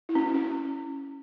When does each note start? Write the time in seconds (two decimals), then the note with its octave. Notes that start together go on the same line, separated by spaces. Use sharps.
0.09 E4
0.15 C#4
0.34 C#4